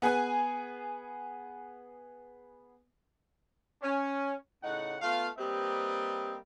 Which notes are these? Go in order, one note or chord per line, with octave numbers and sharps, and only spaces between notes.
B3 G#4 B4 G#5
C#4
A2 C#3 D#4 F#5
A3 B3 F4 F5
G3 A#3 C4 G4 B4 D#5